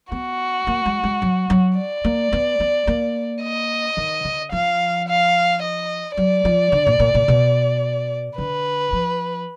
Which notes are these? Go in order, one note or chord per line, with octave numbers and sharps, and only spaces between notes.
B3 F#4
A#3
G#3
G#3
F#3
F#3
D5
A#3
B3
B3
A#3
D#5
D#3
D3
F3 F5
F5
D#5
F#3 D5
F3
D3
A#2
A#2
A#2
B2
D3 B4
F3